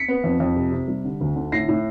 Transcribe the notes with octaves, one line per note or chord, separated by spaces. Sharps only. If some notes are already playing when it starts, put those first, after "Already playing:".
Already playing: B6 C#7
B3
F2
F2
C3
C3
G3
D3
D2
D3
A2 A#6 C7
A2